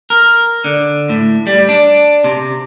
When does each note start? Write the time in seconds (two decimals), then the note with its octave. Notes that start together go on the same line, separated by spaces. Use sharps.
0.10 A#4
0.64 D3
1.09 A2
1.47 G3
1.69 D4
2.24 C3